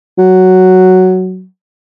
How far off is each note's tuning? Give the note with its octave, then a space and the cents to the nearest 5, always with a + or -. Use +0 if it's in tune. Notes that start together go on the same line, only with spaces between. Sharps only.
F#3 +5